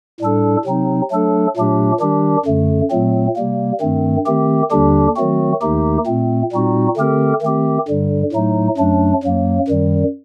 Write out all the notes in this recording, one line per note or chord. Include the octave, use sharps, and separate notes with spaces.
A2 G3 D4 A4
C3 F#3 C4 D#4
F#3 A3 D4 A4
A#2 F#3 A3 D4 G4
D#3 G3 D4 G4
F#2 D3 A3
A#2 F#3 A3 C4
C3 G3 A#3
G2 D#3 A3 C4
D#3 A3 C4 G4
D#2 D3 G3 D4 G4
D#3 F#3 A3 C4 F#4
D#2 D#3 A3 D#4 G4
A#2 A3 C4
A#2 G3 C4 D#4 F#4
D3 A3 C4 G4 A#4
D#3 A3 C4 G4
G2 D3 G3
A2 F#3 A3 D#4
F#2 F#3 A3 D4
F#2 F#3 A#3
F#2 D#3 G3